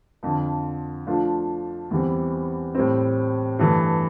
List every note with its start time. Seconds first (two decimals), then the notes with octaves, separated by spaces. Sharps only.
0.23 F2 D3 F3
1.07 F3 A3 D4 F4
1.91 E2 E3 G3 C4
2.75 A2 G3 C4
3.59 G2 E3 A3